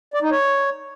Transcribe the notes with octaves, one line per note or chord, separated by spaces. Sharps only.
D5
D#4
C#5